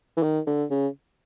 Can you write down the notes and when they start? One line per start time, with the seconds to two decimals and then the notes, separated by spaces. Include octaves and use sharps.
0.17 E3
0.23 D#3
0.47 D3
0.70 C#3